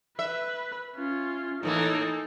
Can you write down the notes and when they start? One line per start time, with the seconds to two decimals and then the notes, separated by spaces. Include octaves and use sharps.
0.19 B4 E5
0.96 C#4 F4
1.63 A2 E3 A#3 D#4 A4